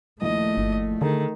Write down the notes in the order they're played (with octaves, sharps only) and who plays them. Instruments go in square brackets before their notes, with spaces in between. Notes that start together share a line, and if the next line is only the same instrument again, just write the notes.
[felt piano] A#1 D#2 E4 [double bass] A3 [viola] D#5
[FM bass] G1
[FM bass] D3 [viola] D#3 [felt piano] G#4 A4